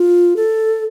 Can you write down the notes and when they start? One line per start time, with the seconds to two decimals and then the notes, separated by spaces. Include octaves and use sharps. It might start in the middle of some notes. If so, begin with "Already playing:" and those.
Already playing: F4
0.36 A4